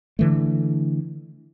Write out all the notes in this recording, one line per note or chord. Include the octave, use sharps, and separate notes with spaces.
D3 E3 A3